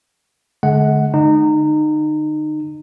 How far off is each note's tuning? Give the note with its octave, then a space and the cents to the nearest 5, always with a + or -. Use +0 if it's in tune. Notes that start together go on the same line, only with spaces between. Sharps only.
D3 +0 G#3 +45 F#5 +0
D3 +25 D#4 -25